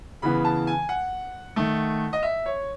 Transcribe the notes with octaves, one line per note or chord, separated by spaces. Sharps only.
C#3 E3 B3 B5
A5
G#5
F#5
D#3 A3
D#5
E5
C#5